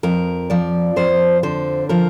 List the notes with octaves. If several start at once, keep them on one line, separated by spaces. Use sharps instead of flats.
F2 A#4
F3 D5
F2 C5
D3 C5
F3 A#4